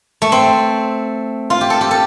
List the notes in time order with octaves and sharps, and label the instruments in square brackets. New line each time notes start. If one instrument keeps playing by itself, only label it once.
[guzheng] A3
C4
F4
G4
A4
G4
A4